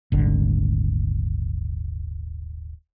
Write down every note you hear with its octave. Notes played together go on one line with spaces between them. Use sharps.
D#1 G#1 D3